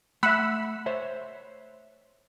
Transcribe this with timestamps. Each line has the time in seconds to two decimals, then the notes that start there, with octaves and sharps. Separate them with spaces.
0.23 A3 E5 F#5 B5 E6
0.86 C5 C#5 E5